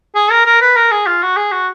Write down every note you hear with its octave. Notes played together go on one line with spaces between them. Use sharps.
G#4
A#4
A#4
B4
A#4
G#4
F4
F#4
G#4
F#4